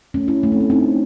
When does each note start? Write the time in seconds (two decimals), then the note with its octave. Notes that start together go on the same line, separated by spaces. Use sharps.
0.14 A3 C#4
0.28 C#4 E4
0.43 A3
0.52 C4
0.61 C#4
0.70 C4 D#4